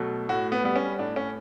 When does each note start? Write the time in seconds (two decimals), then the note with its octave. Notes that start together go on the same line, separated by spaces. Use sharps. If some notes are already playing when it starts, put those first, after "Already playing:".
Already playing: B2 F#3 A3
0.29 A2 F#4
0.52 B3
0.63 G3 B3
0.76 C#4
0.99 A2 D4
1.16 C#4